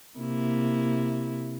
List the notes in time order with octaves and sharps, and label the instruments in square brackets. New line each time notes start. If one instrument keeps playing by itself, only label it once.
[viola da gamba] C3 A#3 E4